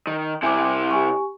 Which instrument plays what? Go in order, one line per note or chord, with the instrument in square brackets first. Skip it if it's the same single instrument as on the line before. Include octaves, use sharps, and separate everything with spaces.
[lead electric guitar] D#3
[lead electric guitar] C3 E4 [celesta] G#5 D6
[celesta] G4 G#5 C#6